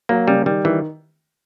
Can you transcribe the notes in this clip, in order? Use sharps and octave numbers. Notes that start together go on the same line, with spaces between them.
F#3 A#3
C#3 G3
D#3 G3
D#3 E3